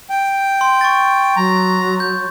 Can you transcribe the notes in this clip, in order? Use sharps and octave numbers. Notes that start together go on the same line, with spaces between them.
G5
C6
C#6 A6
F#3 A#5
G6